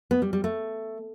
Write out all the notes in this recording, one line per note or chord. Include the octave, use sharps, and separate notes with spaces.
B3
G3
G3
A3